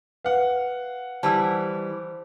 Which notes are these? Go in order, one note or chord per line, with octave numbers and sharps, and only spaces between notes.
B4 F5 F#5
E3 G3 C5 A5 E6